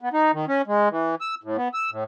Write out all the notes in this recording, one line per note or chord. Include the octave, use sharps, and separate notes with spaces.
B3
D#4
D#3
C#4
G#3
E3
E6
A2
B3
E6
A2